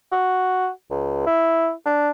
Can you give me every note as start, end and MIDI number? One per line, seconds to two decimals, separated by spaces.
0.12 0.69 66
0.91 1.26 37
1.27 1.72 64
1.86 2.11 62